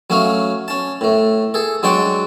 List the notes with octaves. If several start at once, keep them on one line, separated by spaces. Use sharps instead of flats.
F#3 A3 C#4 F5
C#4 A5
A2 A3
G#4 A4
F#3 G#3 D4 D5 G5 C#6